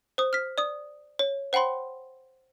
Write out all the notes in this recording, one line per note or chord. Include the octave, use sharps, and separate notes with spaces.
C5 D#6
F6 B6
D5 D#6
C#5
C5 F#5 G5 B5 C6